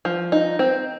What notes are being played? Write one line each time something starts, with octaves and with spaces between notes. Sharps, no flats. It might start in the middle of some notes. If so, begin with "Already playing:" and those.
F3
D#4
C4